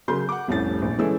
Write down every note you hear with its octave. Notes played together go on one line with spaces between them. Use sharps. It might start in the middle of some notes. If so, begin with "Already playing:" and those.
C#3 F#3 A#4 C6 G6
F#5 D6
F1 C2 A2 C#4 E4 A6
A#1
E3 G#3 C#4 A4 E6